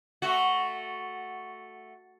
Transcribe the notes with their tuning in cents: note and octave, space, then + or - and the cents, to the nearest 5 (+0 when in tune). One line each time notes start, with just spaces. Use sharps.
A3 +0 F#4 +0